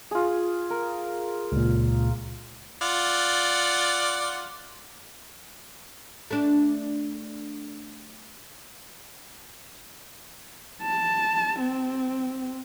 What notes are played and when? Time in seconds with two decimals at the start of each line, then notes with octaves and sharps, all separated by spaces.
0.11 F4 G#4
0.70 A#4
1.52 C#2 A#2
2.81 F4 D5 F#5
6.31 A3 D4
10.82 A5
11.60 C4